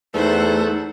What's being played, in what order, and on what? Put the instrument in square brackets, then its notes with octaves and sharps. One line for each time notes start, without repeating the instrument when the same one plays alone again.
[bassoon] E2 [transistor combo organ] A3 [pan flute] D#4 [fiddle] C5 F#5